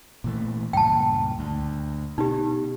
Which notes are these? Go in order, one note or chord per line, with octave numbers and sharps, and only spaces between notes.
A#2 E3 A3
C#2 G2 A#2 G5 A5
D2
B2 D#4 G4